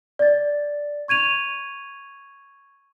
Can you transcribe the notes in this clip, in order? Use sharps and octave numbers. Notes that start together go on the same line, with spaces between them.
D5 A6
C#6 G#6 D#7 F7